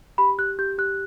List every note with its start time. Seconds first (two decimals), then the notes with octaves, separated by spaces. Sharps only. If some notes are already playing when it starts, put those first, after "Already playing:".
0.18 G4 B5
0.39 G4 F#6
0.59 G4 G6
0.78 G4 F#6